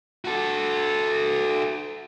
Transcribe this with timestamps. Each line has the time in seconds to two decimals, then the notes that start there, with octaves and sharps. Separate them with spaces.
0.25 F#4 A4